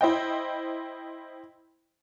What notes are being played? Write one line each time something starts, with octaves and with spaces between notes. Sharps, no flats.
E4 C5 D#5 G5